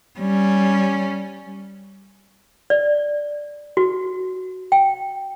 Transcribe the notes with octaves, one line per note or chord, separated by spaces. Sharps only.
G3 C#4
D5
F#4
G5